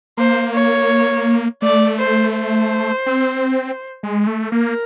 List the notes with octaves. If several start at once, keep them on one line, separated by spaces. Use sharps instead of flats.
A#3 C5
C#5
A3 D5
C5
C5
C4
G#3
A3
A#3 A#4